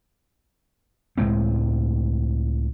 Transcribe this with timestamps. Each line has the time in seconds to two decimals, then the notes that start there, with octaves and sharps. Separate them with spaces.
1.18 C#2 A2 G#3 C4